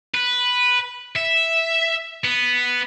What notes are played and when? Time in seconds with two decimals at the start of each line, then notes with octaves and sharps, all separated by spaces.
0.14 B4
1.16 E5
2.24 B3